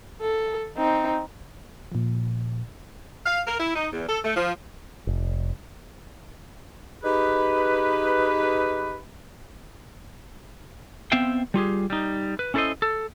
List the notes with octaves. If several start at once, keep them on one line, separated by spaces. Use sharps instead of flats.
A4
C4 D#4
A#2 F3
F5
A#4
E4
D#4
E2
A4
A3
F3
F1
D#4 G4 G#4 B4
B3 C4 C5 E5 F5 G5
G3 F4 G4 G#4
G3 D#4
B4
C#4 E4 A4 A#4 C5 D#5
A4